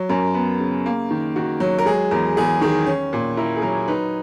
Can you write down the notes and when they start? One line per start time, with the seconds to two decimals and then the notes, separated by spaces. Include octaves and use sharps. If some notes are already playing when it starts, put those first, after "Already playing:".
Already playing: F#3
0.09 F#2 A#4
0.34 B3
0.60 C#3
0.86 A#3
1.11 D#3
1.36 D#3 F#4
1.60 F#3
1.78 A#4
1.86 G#3 G#4
2.11 E2 A#4
2.37 E2 G#4
2.61 D#3 G#4
2.86 C#4
3.13 A#2
3.37 E4 A#4
3.57 G#4
3.62 F#3 A#4
3.88 D#4 B4